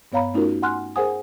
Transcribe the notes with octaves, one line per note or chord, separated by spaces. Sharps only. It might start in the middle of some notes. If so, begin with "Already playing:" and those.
G2 B3 C#5 F5 A#5 B5
A3 C#4 D#4 F4 F#4 A#4
F#5 G#5 C6 F6 F#6
G#4 A#4 C5 F#5 G#5 D#6